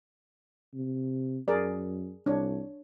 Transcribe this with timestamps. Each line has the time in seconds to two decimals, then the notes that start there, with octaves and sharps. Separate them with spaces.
0.74 C3
1.48 F#2 G#4 A#4 D5
2.26 C2 D4 C#5